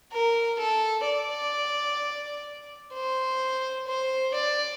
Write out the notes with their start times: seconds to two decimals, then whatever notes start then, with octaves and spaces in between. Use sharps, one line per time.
0.13 A#4
0.60 A4
1.06 D5
2.94 C5
3.87 C5
4.35 D5